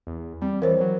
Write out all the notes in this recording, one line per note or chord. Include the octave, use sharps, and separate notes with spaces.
E2
G3 C4
E3 A#4 C5 C#5
F#3